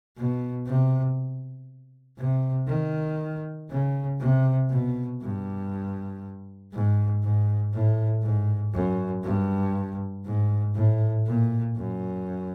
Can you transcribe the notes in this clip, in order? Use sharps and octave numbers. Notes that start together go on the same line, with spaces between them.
B2
C3
C3
D#3
C#3
C3
B2
G2
G#2
G#2
A2
G#2
F#2
G2
G#2
A2
A#2
F#2